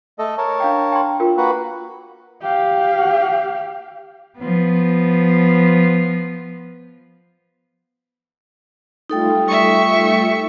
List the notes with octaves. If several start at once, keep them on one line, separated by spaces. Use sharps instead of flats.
A3 A4 D#5
A#4 C#5 A5
D4 F5 G5
G5 C6
F4 A#4 G5
A#3 F#4 B4
G4 F5
F3 B3
G3 A3 D#4 F4 A4 G5
E5 C#6